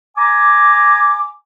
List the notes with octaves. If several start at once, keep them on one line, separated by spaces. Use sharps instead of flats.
G#5 A#5 D6